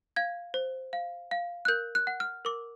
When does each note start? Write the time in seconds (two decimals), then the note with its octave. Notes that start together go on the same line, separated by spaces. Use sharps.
0.16 F5 G#6
0.54 C5
0.93 F5
1.31 F5
1.65 F#6
1.68 A#4 G6
1.95 F#6
2.07 F#5
2.20 F6
2.45 A#4 D6